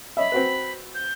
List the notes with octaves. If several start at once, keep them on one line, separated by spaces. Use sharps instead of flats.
C#5 D#5 E5 B5
C4 F#4 B4
G6